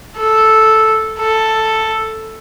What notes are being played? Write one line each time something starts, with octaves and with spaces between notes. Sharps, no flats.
A4
A4